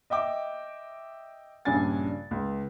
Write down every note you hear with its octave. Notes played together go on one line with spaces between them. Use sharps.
D#5 E5 G5 D6
A#1 G2 C#3 D4 G#5 A6
C#2